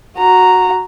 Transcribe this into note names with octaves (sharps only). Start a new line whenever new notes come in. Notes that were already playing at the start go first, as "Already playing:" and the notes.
F#4 A#5